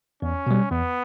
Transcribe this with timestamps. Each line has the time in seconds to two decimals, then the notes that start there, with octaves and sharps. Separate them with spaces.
0.22 E2 C#4
0.46 B2 G3
0.71 E2 B3